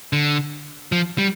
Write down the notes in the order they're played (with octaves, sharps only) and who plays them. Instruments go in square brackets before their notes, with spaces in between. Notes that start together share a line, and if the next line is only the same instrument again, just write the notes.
[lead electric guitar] D3
F3
G3